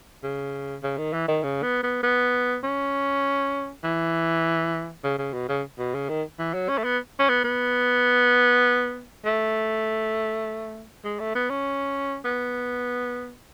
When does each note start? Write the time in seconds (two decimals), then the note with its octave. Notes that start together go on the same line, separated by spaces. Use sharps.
0.23 C#3
0.83 C#3
0.98 D#3
1.13 E3
1.28 D#3
1.43 C#3
1.63 B3
1.83 B3
2.03 B3
2.63 C#4
3.84 E3
5.04 C#3
5.18 C#3
5.33 B2
5.49 C#3
5.79 B2
5.94 C#3
6.09 D#3
6.39 E3
6.54 F#3
6.69 C#4
6.78 A3
6.84 B3
7.19 C#4
7.29 B3
7.44 B3
9.25 A3
11.05 G#3
11.20 A3
11.35 B3
11.50 C#4
12.25 B3